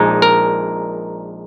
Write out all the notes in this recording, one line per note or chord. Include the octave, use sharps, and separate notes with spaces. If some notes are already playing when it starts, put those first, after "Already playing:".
Already playing: A#1 A#2 G#3 D#4
A#4